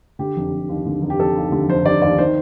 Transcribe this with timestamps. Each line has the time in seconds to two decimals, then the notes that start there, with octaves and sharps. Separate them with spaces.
0.19 D3 G4
0.36 F1
0.52 F1
0.69 D#2
0.86 D3
1.02 F1
1.10 G4
1.19 F1 A4
1.36 D#2
1.52 D3
1.69 F1 C5
1.85 F1 D5
2.02 D#2 D5
2.18 D#3 C5